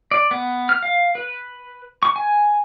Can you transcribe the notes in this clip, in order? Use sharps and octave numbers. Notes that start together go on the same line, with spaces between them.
D5
B3
F6
F5
B4
C#6
G#5